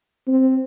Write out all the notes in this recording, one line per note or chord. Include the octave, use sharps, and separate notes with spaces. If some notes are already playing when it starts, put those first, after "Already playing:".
C4